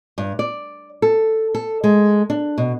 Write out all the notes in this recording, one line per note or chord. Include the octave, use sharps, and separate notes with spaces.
G2
D5
A4
A4
G#3
D4
B2